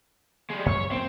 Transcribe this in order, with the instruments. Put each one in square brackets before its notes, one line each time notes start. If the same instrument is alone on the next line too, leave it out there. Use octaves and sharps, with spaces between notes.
[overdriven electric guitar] G3 G#3
[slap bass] F#2 [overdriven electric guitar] C#5
[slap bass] A#2 A#3 [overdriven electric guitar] C4